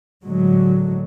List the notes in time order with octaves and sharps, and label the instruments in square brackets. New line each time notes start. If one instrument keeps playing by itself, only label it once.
[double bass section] A2 D3 F#3 G#3